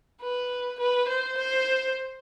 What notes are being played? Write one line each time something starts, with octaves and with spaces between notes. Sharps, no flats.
B4
B4
C5
C5